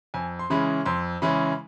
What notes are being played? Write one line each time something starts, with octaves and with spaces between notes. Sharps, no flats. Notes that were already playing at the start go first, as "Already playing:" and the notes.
F2 G#5
C6
C#3 E3 G#3 C#4 B5
F2 C6
C#3 E3 G#3 C#4 B5